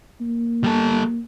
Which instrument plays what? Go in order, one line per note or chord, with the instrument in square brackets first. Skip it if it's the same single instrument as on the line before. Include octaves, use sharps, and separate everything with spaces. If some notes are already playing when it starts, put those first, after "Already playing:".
[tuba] A#3
[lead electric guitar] G3 A4